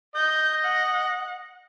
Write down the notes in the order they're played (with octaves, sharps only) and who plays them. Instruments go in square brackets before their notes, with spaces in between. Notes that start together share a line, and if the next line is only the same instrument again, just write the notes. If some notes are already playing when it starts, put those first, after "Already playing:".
[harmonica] D#5 [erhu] G6
[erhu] F#5